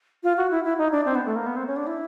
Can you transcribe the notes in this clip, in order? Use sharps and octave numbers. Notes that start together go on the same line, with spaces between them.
F4
F#4
E4
E4
D#4
D4
C4
B3
A3
A#3
B3
C4
C#4
D4
E4